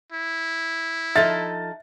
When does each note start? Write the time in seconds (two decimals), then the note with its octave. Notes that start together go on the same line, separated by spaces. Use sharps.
0.12 E4
1.16 F3 D#4 A4 E5 A6